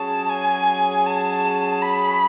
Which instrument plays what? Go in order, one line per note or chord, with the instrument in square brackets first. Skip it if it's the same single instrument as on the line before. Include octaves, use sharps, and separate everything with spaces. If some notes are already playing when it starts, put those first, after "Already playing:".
Already playing: [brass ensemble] F#3 C#4 G#4 C#5 [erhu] A5
[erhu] G#5
A5
B5